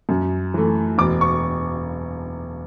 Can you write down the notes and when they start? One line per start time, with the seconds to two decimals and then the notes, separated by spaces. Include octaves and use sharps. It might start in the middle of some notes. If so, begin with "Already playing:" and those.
0.09 F#2
0.54 E3 A3
0.98 E1 D6
1.21 C#6